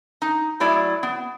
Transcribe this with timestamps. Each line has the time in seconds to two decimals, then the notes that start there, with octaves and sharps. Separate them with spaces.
0.22 D#4
0.60 F#3 A3 E4 G#4 D5
1.03 B3